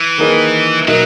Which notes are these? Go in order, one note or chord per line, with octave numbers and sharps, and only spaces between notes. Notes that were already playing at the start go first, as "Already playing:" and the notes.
Already playing: E3
D#3 A#3 D#4 G#4 B4
B2 F#3 A#3 D#4 A#4 E5